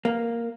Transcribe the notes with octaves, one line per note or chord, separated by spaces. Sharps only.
A#3